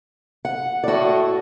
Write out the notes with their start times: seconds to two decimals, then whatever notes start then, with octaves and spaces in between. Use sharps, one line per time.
0.45 F#5
0.84 A2 F#4 D5